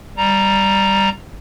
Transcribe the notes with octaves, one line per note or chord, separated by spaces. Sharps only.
G3 A#5